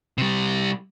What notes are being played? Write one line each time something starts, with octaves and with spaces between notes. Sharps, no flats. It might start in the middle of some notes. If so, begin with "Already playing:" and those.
C3 G3